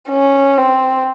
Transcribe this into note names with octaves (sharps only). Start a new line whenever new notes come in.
C#4
C4